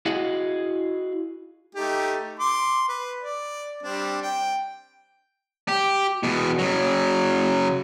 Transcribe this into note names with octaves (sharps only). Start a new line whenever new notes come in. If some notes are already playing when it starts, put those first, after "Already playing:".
E4 F#4 G#4 D#5 F5 F#5
A3 D#4 G4
C6 D6
B4
D5
G3 C4 D4
G5
G4
E2 B2
C#3 F#3